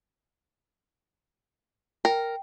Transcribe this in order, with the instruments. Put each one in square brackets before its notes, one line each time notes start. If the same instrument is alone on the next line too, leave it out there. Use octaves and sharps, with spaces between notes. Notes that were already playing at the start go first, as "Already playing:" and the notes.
[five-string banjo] A#4 [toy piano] G5